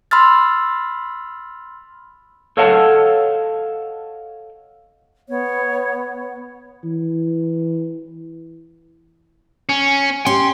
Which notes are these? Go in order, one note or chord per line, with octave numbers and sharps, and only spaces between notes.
B5 C6 E6 F6 A6
A4 C#5 D#5 F5 F#5 A5
B3 C#5
E3
C#4
C#4 G4 C6